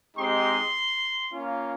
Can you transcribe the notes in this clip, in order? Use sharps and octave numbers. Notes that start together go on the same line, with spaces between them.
G#3 C4 D#4 G4 C6
A#3 C#4 F4